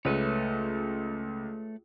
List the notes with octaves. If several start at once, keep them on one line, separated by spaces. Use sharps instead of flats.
C#2 A3 B4 C#5